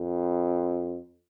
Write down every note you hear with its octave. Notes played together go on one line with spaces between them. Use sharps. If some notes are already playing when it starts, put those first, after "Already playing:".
Already playing: F2